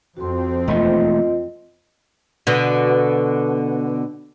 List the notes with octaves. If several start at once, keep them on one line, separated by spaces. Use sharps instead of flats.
F2 C4 F#4 C6
E1 D#2 A3 F4 D#5
B2 D3